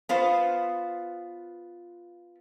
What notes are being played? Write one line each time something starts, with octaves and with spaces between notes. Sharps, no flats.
B3 F4 C5